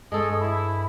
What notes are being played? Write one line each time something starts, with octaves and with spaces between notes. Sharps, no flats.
G2 G#3 A4 C#5 D#6
E4 B5